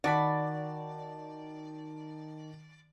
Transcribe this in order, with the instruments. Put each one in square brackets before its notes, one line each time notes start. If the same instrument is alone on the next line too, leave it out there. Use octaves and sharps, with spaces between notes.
[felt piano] D#3 A5 [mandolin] F#4 B5 [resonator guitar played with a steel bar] D5